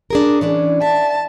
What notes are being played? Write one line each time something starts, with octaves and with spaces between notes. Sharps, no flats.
D4 G#4 A#4
E3 C#4 D4 D5
E5 A5